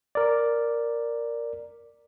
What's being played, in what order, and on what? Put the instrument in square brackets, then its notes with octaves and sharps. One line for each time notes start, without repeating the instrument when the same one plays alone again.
[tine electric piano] A#4 D5